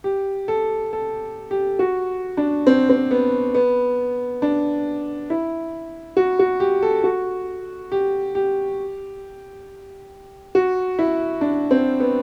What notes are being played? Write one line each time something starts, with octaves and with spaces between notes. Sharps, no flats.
G4
A4
A4
G4
F#4
D4
C4
C4
B3
B3
D4
E4
F#4
F#4
G4
A4
F#4
G4
G4
F#4
E4
D4
C4
B3